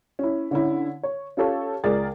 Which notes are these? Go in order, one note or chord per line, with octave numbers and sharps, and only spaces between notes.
C#4 E4
D3 C#4 E4
C#5
C#4 F4 G4 A4 C#5
C#2 G#4 A#4 D5 A6